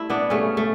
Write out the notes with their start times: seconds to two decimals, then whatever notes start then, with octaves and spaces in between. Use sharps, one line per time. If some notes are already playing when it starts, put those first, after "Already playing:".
Already playing: G3 A3 E4
0.10 B3 D4
0.30 C#3 G3 A3 C#4
0.57 A3